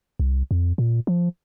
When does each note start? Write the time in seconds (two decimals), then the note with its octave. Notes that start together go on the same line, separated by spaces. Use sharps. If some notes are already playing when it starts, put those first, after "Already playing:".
0.20 C2
0.51 F2
0.78 A#2
1.07 F3